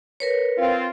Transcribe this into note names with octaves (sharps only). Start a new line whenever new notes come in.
A#4 B4 C#5
C4 F4